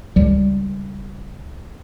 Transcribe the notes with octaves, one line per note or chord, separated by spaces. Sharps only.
C#2 G3